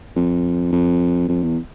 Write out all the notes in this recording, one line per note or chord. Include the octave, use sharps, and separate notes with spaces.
F2
F2
F2
E2